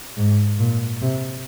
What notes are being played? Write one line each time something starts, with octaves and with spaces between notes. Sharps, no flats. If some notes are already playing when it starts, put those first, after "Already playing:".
G#2
A#2
C3